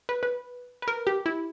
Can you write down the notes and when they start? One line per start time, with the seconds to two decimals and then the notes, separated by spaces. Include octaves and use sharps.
0.09 B4
0.23 B4
0.82 B4
0.88 A#4
1.07 G4
1.26 E4